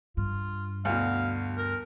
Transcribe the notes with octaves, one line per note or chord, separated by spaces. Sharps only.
G2 F4
D2 B2 F5
A#4